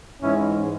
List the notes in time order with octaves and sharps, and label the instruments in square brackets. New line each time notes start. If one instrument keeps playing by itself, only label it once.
[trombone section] G#2 E3 G#3 C#4 E4